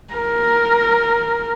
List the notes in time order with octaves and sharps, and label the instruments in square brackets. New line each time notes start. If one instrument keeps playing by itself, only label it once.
[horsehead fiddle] A#4